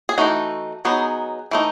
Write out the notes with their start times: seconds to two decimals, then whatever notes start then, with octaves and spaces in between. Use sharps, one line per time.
0.09 G#4
0.18 E3 A3 D#4 F#4
0.85 F#3 B3 D#4 G#4
1.51 E3 A3 D#4